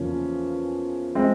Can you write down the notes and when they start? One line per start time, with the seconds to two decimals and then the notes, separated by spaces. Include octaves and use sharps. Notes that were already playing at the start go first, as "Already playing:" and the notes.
Already playing: E2 C#3 F3 A#3 C#4
1.15 G#3 C4